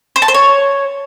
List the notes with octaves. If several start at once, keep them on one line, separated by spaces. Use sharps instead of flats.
C5
A5
C5
C#5